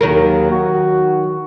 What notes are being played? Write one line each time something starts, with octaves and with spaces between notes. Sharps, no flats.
D#2 D#3 F#3 A#4
F#4